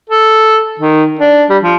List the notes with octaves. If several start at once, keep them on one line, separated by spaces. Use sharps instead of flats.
A4
D#3
D4
G3
F3